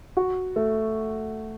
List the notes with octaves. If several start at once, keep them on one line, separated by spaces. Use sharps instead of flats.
F#4
A3